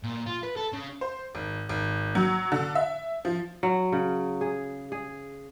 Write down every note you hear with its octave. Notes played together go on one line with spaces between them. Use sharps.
A#2
F4
B4
A4
C#3
C5
G#1
G#1
F#3
D3
E5
F3
F#3
C#3
G#4
G#4